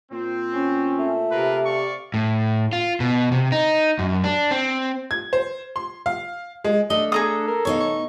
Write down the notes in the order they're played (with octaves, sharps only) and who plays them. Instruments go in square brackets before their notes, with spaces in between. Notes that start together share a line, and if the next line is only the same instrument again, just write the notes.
[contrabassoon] A#2 [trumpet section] C4
[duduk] C#4
[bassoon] A3
[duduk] C3 [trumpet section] F4 A#4 B4
[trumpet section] D5 F5 C#6
[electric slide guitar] A2
F4
B2
C3
D#4
F#2
D4
C4
[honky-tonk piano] G#6
C5
C6
F5
G#3
[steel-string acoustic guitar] A3 [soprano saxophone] D4 [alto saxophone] D#5
[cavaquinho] G#4 A#5 D#6 [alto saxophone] A4
[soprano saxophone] A#4
[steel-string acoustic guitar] B2 D#4 F5 [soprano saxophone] C#5
[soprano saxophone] C#6